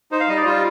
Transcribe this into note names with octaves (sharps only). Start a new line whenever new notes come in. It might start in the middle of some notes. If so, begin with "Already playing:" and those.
D#4 C5
F5
G3 D#5
D5
G3 F4